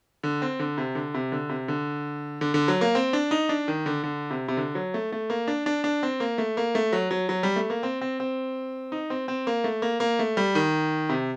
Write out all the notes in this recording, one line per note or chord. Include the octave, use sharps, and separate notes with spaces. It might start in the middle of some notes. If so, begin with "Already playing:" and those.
D3
C4
D3
C3
D3
C3
D3
C3
D3
D3
D3
F#3
A#3
C4
D4
D#4
D4
D#3
D3
D3
C3
C3
D3
F#3
A3
A3
A#3
D4
D4
D4
C4
A#3
A3
A#3
A3
F#3
F#3
F#3
G3
A3
A#3
C4
C4
C4
D#4
C4
C4
A#3
A3
A#3
A#3
A3
G3
D#3
C3